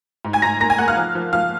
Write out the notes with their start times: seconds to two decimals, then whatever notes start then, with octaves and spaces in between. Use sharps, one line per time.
0.25 G#2
0.33 G#5 G#6
0.42 G#2 A#5 A#6
0.61 A#3 A#5 A#6
0.70 G#5 G#6
0.78 A#3 F#5 F#6
0.88 F5 F6
0.97 F3
1.15 F3
1.33 F3 F5 F6